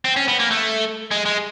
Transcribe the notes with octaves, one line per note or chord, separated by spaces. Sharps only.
C4
C#4
B3
A#3
A3
G#3
G#3